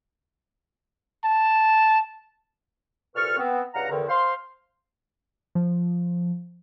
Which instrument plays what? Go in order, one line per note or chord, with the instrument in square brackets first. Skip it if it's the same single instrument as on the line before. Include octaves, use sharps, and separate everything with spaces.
[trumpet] A5
[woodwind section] C2 A#2 A4 B4 C#6 F6
B3 C4
C#2 G2 F5 F#5 A#5
E2 D3 D#3
C5 F5 C6
[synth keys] F3